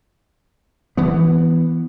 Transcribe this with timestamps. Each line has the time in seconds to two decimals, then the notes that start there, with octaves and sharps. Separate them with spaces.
0.97 E3 B3